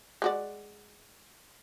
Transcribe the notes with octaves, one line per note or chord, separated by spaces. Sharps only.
G#3 F#4 D5